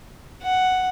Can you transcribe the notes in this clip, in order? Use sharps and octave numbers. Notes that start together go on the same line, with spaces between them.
F#5